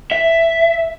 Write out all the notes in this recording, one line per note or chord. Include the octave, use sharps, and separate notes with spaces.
E5